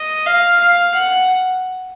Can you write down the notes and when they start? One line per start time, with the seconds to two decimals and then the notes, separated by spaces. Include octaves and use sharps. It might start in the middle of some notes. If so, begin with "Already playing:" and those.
Already playing: D#5
0.26 F5
0.60 F5
0.94 F#5